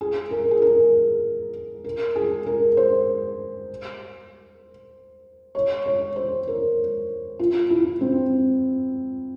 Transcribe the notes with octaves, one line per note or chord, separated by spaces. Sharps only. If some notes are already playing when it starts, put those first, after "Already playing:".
G#4
A#4
G#4
A#4
A#4
G#4
A#4
C5
C#5
C#5
C5
A#4
F4
E4
C4